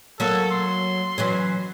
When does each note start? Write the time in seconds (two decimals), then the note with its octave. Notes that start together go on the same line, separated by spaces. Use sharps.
0.20 F#3 A#3 A4
0.51 C6
1.18 E3 F#3 C#4